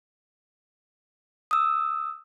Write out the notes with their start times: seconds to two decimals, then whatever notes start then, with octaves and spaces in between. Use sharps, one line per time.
1.51 D#6 E6